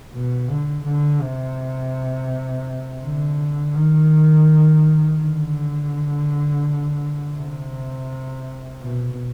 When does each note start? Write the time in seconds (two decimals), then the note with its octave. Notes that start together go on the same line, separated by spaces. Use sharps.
0.13 B2
0.50 D3
0.85 D3
1.21 C3
3.02 D3
3.75 D#3
5.19 D3
7.36 C3
8.80 B2